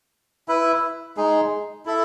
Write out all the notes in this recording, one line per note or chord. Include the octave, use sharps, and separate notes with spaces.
E4 B4 E5
G#3 D#4 G#4
E4 A4 E5